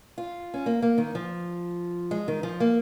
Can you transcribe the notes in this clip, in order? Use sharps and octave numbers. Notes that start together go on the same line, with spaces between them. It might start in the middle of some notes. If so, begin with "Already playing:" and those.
F4
C#4
A#3
A#3
D#3
F3
G#3
D#3
F3
A#3